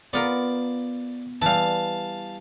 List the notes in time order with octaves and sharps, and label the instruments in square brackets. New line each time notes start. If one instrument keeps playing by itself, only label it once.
[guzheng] B3 F4 A#4 [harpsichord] D5
[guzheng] E3 G3 [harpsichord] F5 A5